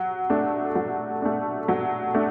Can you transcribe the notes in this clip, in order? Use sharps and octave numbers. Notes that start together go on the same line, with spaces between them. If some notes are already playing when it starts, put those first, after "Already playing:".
Already playing: F#3
A3 D4
F#3
A3 D4
F#3
A3 D4